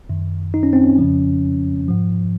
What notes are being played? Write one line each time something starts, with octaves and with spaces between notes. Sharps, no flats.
F#2 D#3
D#4
C#4
C4
C#4
F2 C#3 F3
G#2 F3